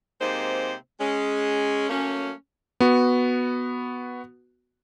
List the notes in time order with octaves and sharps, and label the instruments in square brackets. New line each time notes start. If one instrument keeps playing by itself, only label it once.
[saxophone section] C3 G#3 A#3 C4 D#4 C5
G#3 C#4
F#3 A3 A#3 C#4
[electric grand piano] B3 F#4